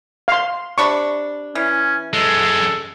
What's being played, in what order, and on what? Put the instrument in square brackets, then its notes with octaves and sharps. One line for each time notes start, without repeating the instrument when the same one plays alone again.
[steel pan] F5 C6
[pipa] C3 D4 B5 [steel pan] C#6
[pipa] E3 [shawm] C#4
[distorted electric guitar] F#2 G#3 [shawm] A4